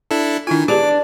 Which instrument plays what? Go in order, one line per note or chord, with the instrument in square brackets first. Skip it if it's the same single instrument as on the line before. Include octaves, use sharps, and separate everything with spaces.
[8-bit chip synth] D4 E4 A4
[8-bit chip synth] D#3 G#5 [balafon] D4 E4 F4
[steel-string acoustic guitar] D4 [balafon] G4 G#4 B4 [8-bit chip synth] D6